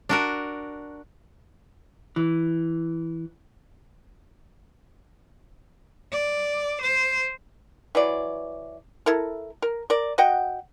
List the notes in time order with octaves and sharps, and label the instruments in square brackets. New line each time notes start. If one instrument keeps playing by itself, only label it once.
[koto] D4 F#4 A#4
[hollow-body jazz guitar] E3
[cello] D5
C5
[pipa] E3 F#3 D5
E4 A4 A#4
A#4
A#4 D5
F#4 D#5 F#5 G5